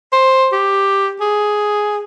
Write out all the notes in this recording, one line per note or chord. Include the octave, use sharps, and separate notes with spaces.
C5
G4
G#4